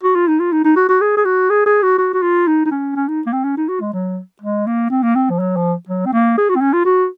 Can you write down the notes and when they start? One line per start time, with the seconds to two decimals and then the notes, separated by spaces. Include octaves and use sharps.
0.03 F#4
0.15 F4
0.28 D#4
0.40 F4
0.52 D#4
0.65 D#4
0.77 F#4
0.89 F#4
1.01 G#4
1.17 G#4
1.25 F#4
1.50 G#4
1.66 G#4
1.83 F#4
1.98 F#4
2.14 F#4
2.23 F4
2.47 D#4
2.66 D#4
2.71 C#4
2.96 C#4
3.08 D#4
3.27 A#3
3.33 C4
3.44 C#4
3.57 D#4
3.69 F#4
3.81 G#3
3.93 F#3
4.42 G#3
4.67 A#3
4.91 C4
5.03 A#3
5.15 C4
5.30 F3
5.40 F#3
5.56 F3
5.89 F#3
6.06 C4
6.13 A#3
6.38 G#4
6.50 F#4
6.56 C4
6.61 C#4
6.73 F4
6.85 F#4